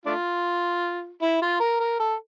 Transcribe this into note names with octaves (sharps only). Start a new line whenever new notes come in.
A3 D4 F4
E4
F4
A#4
A#4
A4